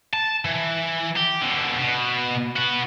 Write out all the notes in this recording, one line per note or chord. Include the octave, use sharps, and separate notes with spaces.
A5
E3
G4
B2 D3
B2
F#4 B4